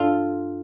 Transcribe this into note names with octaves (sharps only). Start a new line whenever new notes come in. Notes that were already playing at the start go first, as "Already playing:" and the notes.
Already playing: G2 F4 A4